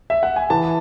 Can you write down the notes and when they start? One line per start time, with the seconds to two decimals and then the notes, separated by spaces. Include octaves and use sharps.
0.10 E5
0.23 F#5
0.36 G#5
0.50 E3 A5